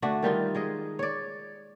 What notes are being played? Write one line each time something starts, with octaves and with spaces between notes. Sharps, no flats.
D3 A3 D4 F#4
D#3 G3 D#4 F4
G#3 G#4 D#5
C#5 D5